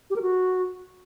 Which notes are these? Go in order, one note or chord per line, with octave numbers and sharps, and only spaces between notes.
G4
A#4
F#4